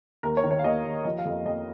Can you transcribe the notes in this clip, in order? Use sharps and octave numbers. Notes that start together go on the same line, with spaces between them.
D#2 A#4
C#5
D#3
C#5
F5
D#2 D#5
D#2
F3 D#5
F5
F2
F2 D#5